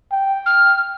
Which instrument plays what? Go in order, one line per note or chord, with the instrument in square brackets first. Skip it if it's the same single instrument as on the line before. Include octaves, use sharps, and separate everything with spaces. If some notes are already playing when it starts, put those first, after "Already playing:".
[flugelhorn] G5
[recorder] F6